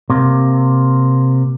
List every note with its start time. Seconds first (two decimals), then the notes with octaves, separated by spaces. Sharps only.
0.10 C3 A#3